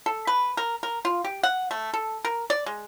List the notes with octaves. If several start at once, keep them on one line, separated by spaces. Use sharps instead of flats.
A4
B4
A#4
A#4
F4
G4
F#5
A3
A4
A#4
D5
G#3